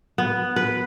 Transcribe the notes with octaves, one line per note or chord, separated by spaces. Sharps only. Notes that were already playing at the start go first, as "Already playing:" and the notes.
B3
B4